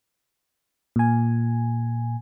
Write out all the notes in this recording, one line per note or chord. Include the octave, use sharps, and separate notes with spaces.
A#2 G#5